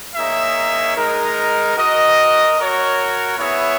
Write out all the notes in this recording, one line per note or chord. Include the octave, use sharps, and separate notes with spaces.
A#3 D#4 G#4 C#5 E5
G#3 D#4 A#4
F#4 A#4 D#5
F#4 A#4 C#5
B3 E4 G#4 C#5 E5